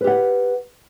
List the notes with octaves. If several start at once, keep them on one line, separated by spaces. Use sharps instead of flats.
G4 B4 F#5